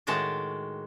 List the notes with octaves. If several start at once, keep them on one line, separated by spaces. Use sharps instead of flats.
A2 D#3 G#3 F#4 A5